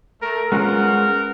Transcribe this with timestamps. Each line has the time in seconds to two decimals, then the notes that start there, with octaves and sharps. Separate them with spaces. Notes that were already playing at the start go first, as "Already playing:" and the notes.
0.22 A3 A#4
0.52 G#3 B3 C#4 F4 A#4 F#5